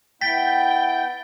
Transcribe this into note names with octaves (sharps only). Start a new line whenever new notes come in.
B3 E4 G5 A6 B6